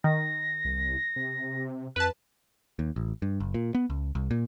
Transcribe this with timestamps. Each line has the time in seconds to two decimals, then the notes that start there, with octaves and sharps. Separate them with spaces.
0.04 D#3 A#6
0.65 C2
1.16 C3
1.96 F2 B4 A5 F#6
2.79 D#2
2.96 A1
3.22 G2
3.40 F#1
3.54 A#2
3.75 B3
3.90 C#2
4.15 C2
4.31 A#2